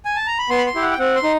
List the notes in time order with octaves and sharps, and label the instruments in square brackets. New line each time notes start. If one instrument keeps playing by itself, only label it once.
[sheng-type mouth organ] G#5
A5
A#5
B5
B3 C6
B5
C6
E4 G4
F#5
G5
C4 F#5
C6
D#4